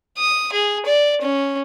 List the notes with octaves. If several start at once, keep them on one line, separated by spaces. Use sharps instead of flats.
D#6
G#4
D5
C#4